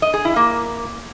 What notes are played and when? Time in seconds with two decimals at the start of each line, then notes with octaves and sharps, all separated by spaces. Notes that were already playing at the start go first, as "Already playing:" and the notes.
0.02 D#5
0.14 G#4
0.25 E4
0.36 A#3